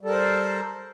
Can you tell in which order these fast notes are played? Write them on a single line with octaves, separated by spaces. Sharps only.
G3 A4 A#4 C5